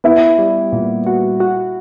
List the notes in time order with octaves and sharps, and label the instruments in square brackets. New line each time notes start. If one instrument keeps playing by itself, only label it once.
[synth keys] B3 [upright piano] E4
[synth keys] G3
A#2
F#4
F#4